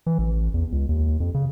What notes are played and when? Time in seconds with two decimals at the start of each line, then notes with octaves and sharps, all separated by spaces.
0.06 E3
0.18 A1
0.54 E2
0.72 C#2
0.89 D#2
1.20 F2
1.34 C#3